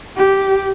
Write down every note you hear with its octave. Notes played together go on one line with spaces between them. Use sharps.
G4